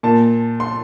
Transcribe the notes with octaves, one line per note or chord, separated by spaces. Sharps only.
A#2 A5
C6